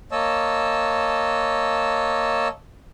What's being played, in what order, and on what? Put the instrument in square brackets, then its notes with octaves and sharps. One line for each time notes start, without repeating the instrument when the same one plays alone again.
[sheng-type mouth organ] A#3 C#5 D#5 A5 E6